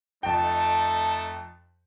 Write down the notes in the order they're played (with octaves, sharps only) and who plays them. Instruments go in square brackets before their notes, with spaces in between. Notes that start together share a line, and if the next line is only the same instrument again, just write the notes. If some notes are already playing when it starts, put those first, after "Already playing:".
[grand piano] F2 G5 [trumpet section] A3 D#4 A5